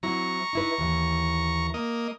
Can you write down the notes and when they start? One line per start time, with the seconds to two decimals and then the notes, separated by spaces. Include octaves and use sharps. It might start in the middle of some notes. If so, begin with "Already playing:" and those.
0.03 F#3 C4 E4 A#5 C#6
0.53 D#4 E4 B4
0.78 D#2 E3
1.74 A#3 D#5